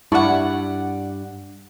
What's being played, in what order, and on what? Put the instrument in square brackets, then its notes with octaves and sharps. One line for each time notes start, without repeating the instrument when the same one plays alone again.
[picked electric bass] G2 [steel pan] E4 A5 C#6 [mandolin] D5 F#5